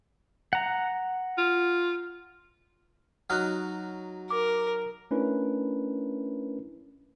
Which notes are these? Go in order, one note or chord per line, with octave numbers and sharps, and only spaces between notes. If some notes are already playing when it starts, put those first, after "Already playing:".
F#5 A#5
F4
F#3 D#4 F6 F#6
A#4 D6
A3 C#4 D4 E4 A#4 B4